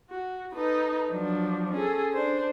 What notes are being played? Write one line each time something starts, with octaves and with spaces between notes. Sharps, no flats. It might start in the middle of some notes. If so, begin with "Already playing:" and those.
F#4
D#4 A4 B4
F3 F#3 D4
C#4 G#4 A4
D4 C5